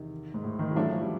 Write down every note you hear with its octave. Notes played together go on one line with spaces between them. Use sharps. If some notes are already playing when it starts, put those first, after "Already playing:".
Already playing: E2 C3 D#3
G#2
A2
D#3
E3
A1 A2 F3 F#3 A3 D4
F3
G3